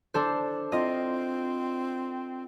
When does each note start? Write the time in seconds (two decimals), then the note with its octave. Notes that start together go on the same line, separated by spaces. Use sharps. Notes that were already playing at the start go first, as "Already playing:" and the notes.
0.14 D4 A4 C5
0.72 C4 F4 D#5